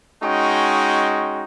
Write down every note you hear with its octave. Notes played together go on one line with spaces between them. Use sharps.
G#3 C#4 D#4 F#4 G5